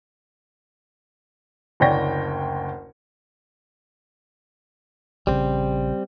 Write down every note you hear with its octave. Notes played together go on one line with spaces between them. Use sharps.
F#1 D2 C#5 D5 G5 A#6
A#1 C#3 G3 C4